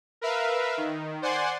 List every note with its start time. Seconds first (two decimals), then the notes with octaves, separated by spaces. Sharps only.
0.21 A#4 B4 E5 F5
0.77 D#3
1.22 C5 D5 F#5 G#5 C6